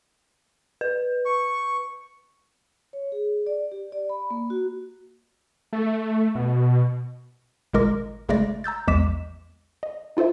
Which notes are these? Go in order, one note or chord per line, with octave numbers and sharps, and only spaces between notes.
B4
C#6
C#5
G#4
D5
G4
D5
B5
A#3
F#4
A3
B2
G#1 A#2 G#3 A#4 D6 A#6
G#1 C#3 G#3 A3 D5 A#6
A#5 E6 G6 A6
A#1 E2 G#3 D6 B6 E7
D#5
D#4 F4 A4 C5 E5